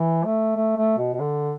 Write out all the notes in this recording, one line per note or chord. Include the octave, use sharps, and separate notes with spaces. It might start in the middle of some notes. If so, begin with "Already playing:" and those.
Already playing: E3
A3
A3
A3
B2
B2
D3